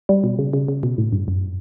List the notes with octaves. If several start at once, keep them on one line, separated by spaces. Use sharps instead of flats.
G3
B2
C#3
C#3
C#3
B2
A2
G2
F#2